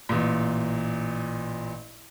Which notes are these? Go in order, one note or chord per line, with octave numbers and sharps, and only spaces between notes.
A1 A#2